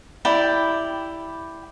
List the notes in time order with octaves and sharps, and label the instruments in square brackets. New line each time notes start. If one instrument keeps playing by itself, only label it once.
[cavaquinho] E4 G4 D5 G5